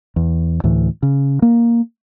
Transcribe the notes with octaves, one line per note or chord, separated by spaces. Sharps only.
E2
D2 A2 E3
C#3
A#3